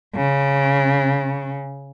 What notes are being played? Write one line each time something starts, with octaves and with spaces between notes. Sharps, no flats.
C#3